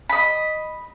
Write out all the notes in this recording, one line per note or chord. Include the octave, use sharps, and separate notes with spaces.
D#5 B5